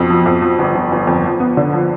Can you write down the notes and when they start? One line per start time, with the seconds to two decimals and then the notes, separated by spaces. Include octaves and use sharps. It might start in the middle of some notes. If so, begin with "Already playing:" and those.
Already playing: F2 B2
0.10 F3
0.26 F2
0.42 F3
0.59 G1
0.75 G1
0.92 G1
1.07 F2
1.25 F3
1.40 B3
1.57 D3
1.74 F3